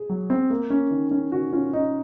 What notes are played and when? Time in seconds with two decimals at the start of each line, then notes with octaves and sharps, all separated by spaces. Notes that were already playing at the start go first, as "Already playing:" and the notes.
Already playing: G#4
0.09 F#3
0.30 C4
0.50 A#3
0.70 C#4
0.91 D#3
1.11 C#4
1.32 D#3 F#4
1.53 C#4 F4
1.73 C#4 D#4